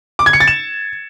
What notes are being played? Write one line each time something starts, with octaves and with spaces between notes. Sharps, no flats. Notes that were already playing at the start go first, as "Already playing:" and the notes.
D6
G#6
C#7
A6
E7